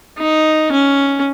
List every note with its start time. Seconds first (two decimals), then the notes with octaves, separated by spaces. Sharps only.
0.18 D#4
0.72 C#4